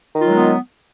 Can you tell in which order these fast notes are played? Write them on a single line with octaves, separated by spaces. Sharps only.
D#3 F4 F#3 G#3 B3